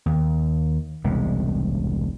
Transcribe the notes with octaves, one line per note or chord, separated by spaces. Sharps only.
D#2
E1 C2 G3 G#3